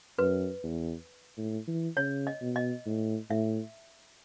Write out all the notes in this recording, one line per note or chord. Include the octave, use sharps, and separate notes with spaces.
F#2 B4
E2
A2
E3
C#3 C#5
D#5
B2
D#5
A2
A2 E5